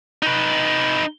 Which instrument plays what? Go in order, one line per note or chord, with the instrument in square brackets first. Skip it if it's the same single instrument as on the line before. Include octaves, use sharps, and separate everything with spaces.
[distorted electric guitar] D#4 B4